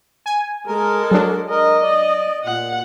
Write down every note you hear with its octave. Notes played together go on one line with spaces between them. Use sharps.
G#5
G#3 A4 A#4
F#3 D4
A#4 D#5
D5
A#2 F#5